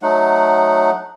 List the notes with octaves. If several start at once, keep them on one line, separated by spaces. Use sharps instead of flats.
F#3 A3 D#4 F#5